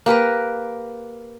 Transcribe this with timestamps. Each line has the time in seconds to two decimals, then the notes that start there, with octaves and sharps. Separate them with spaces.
0.06 A#3 G4 A#4 B4